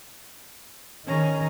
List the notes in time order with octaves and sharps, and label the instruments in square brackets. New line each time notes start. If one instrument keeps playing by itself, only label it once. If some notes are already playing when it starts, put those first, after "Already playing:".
[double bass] D#3 [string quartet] C#4 G#4 A#5